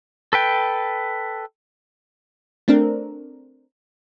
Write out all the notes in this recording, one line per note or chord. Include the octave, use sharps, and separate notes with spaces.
A4 B4 G5
A3 C4 D4 A#4